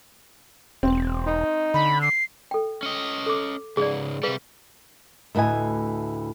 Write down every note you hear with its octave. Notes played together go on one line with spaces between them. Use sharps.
E1 C4
D#4
D3 B5
C7
A4 G5
C#4 D#5
A4 D6
C#2 G#2 G#4 D5
C3 G3 G#4 B4 F5
D2 A2 B4 D#5 G#5